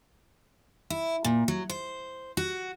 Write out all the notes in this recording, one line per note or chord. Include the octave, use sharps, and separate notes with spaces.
E4
A#2
F#3
C5
F#4